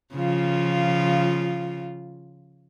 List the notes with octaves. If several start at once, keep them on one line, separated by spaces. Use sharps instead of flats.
C#3 F3 F4